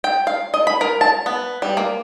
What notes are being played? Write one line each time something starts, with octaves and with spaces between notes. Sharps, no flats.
G5
F5
D#5
B5
A#4
A5
B3
G3
A#3